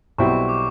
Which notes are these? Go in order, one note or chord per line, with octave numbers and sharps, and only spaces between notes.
B1 B2 G3 C4 E4 C#6
D6